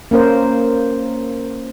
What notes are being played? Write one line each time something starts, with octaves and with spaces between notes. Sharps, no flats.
A#3 C#4 A#4 C5